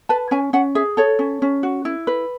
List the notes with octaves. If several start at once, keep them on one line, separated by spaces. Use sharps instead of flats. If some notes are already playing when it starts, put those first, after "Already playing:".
B4 A5
C#4 G#5
C#4 F#5
G#4 E5
A4 C#5
C#4
C#4
F#4
E4
B4